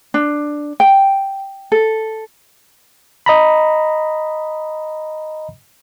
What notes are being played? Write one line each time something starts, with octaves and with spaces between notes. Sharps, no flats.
D4
G5
A4
D#5 A#5 B5